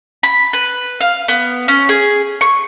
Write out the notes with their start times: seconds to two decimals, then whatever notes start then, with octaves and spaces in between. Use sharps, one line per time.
0.23 B5
0.53 B4
1.01 F5
1.28 B3
1.68 C#4
1.89 G#4
2.41 C#6